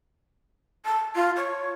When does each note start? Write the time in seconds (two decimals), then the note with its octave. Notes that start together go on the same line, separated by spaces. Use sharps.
0.85 A5
1.15 F4
1.36 C#5